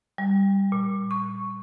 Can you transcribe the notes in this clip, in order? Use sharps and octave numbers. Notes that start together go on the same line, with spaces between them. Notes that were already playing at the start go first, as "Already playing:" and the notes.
G3
A#2
C#6